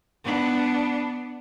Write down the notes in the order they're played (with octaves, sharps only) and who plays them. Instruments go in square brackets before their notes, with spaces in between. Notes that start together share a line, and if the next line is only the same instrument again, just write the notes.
[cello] B3 D4